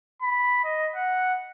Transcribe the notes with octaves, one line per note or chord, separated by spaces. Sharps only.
B5
D#5
F#5